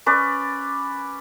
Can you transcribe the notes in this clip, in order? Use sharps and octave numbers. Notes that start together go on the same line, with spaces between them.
C#4 B4 D5